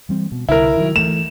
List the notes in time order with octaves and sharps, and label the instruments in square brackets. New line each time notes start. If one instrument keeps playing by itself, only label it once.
[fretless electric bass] E3 G3 C4
B2
[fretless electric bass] C2 D3 [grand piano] E4 A#4
[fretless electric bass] D#3 F#3
[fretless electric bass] E3 A3 [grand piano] E7